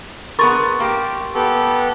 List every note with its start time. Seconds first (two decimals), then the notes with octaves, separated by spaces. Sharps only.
0.39 B3 G#4 A#4 C6 C#6 A6
0.80 A#3 G4
1.34 B3 G4 A4